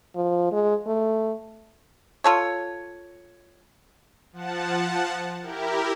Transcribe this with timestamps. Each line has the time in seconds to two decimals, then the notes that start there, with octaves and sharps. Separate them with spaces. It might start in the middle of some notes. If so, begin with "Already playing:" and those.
0.16 F3
0.52 G#3
0.87 A3
2.24 F4 A4 C#5
4.33 F3 F#5 A5
5.42 E4 G4 A#4